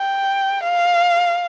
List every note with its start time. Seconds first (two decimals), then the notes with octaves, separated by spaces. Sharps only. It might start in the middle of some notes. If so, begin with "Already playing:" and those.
Already playing: G5
0.64 F5